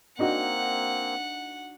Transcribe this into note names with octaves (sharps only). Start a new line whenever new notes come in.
A#3 C4 D4 D#4 F#4 F#5